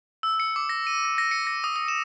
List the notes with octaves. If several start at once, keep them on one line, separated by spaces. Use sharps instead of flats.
E6
C#7
D6
A#6
D#7
A#6
A#6
C#7
A#6
D#6
D#6
E7